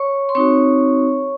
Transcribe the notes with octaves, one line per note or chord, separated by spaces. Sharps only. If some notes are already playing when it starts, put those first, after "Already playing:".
Already playing: C#5 C#6
C6
C4 D#4 F#4 C#5 C#6